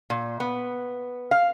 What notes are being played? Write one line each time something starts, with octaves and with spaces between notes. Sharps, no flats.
A#2
B3
F5